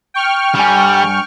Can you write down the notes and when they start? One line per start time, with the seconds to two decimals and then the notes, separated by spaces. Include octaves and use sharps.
0.14 G5 C#6 F6
0.55 G2 G3 G#5